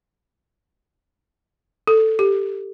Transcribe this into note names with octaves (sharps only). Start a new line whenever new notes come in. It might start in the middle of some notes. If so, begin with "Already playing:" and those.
A4
G4